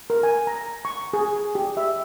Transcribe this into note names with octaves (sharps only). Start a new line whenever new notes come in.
A#4
G#5
A#5
C#6
G#4
G4
E5